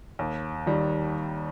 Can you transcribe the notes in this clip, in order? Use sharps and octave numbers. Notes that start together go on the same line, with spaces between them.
D#2
D#3 G3